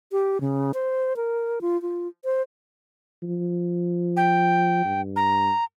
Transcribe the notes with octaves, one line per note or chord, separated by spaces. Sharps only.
G4
C#3
C5
A#4
F4
F4
C5
F3
G5
G2
A#5